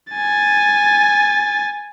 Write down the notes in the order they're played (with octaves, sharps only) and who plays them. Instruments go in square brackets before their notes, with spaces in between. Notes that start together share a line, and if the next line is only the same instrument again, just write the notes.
[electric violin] G#5 A6